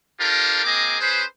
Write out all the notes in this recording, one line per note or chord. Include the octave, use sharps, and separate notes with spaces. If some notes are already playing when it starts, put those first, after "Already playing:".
D4 F4 G4 A4 A#4
A#3 C4 G#4 A#4 D#5 D6
C#4 G#4 B4 C5